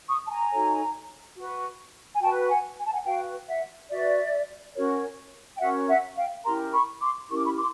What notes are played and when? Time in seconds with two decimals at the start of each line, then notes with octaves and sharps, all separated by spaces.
0.09 C#6 D#6
0.26 A5
0.31 G#5 A#5
0.52 D#4 F#4 A4 C#5
1.37 F#4 B4
2.14 G#5
2.21 F#4 G5 A5
2.25 B4
2.49 F#5 G#5
2.78 G#5
2.85 A5
2.93 F#5 G#5
3.06 F#4 B4 F5 G5
3.48 E5 F#5
3.91 F#4 B4 D5 E5
4.75 C#4 F#4 A#4 C#5
5.55 G5
5.60 C#4 F#4 A#4 C#5 E5 F#5
5.89 E5 F#5
6.16 F5 G5
6.44 C#4 E4 G4 A#4 A#5 C6
6.73 B5 C#6
7.01 C6 D6
7.29 C#4 E4 G4 A#4 C#6
7.37 D6
7.45 B5 C#6
7.57 C6 D6